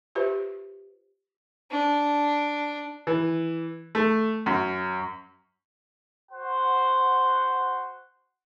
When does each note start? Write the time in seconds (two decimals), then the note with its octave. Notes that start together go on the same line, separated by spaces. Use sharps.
0.15 F4 G4 B4 C5 E5
1.71 D4
3.07 E3
3.95 A3
4.46 F#2
6.32 F#4 C5 F#5